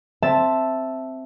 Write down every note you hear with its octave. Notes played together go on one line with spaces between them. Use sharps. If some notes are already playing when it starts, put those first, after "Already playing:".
C4 E5 A5